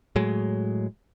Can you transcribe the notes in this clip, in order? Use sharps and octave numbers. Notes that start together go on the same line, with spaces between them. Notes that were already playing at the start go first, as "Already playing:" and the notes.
A2 F#3 G#3